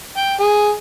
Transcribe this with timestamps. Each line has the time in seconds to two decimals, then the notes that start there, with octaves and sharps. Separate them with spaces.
0.17 G5
0.40 G#4